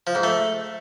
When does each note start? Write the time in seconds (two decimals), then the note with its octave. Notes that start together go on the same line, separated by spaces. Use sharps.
0.07 F3
0.15 G#2
0.23 A3